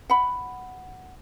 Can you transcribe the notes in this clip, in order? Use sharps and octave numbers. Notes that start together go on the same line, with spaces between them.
F#5 B5